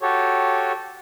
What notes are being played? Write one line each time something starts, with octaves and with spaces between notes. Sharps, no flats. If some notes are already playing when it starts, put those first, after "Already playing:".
F#4 G4 A4 C#5